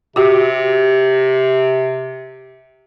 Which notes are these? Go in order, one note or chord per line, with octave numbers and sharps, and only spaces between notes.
C3 F#4 G4